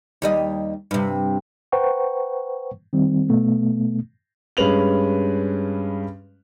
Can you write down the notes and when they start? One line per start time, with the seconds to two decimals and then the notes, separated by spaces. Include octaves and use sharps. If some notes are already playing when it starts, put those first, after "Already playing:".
0.22 D#2 G3 D#5
0.91 G2 C3
1.72 B4 C5 F#5 G5 A#5 C#6
2.93 D#3 G3 C4
3.30 B2 A3 B3
4.57 G2 G#3 C#4 B4 F7 F#7